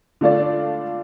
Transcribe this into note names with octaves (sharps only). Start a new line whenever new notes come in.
D3 A3 D4 F4 D5